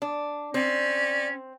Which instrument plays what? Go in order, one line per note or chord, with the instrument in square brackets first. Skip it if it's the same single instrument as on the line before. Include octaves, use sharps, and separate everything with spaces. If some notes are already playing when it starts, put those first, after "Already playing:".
[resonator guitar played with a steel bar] D4
[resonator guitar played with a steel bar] C4 [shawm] C#4 [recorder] D5